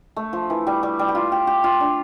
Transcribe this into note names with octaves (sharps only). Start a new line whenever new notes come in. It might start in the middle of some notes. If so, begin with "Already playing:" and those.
A3
F3
E3
G3
G3
G3
G4
F4
G4
G4
F4
D4